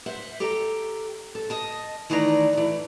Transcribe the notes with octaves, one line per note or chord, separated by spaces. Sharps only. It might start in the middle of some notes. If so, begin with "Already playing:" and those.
C5 E5 F#5
G4 A4 G5 A#5
A4
D#5 A5
D#3 E3 A3 D5 F#5 A#5
E3 A3